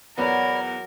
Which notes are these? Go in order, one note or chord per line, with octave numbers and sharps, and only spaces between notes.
E2 F#3 B3 A#4 C#5 D5 G#5 B5